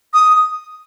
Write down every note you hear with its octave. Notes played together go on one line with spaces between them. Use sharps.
D#6